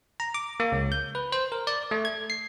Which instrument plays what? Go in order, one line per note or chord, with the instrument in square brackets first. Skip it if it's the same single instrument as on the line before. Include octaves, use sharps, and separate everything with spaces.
[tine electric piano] A#5
D6
A#3
C#2
G6
B4
C5
A#4
D5
A3
G#6
C7